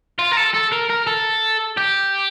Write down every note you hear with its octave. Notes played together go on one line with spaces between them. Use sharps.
F4
A#4
A4
A4
A#4
A#4
A4
G4